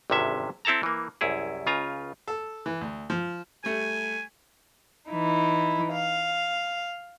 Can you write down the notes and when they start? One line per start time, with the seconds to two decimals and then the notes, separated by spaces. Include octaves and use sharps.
0.10 G#1 E2 G2 C3 C#4 E5
0.65 C4 E4 A4 A5 A#5
0.83 E3 A#3
1.21 C2 F#2 E4 G#4
1.66 C#2 C#3 F4 G#5 A#5
2.28 A4
2.66 E3
2.81 D2
3.10 F3
3.64 G3 A3 G#5
5.09 E3 D#4 E4
5.92 F5